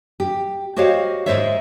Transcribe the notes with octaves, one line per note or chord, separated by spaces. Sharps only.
G4
F#4 G4 C5 C#5 D#5 F5
G#2 F3 G#3 C5 C#5 E5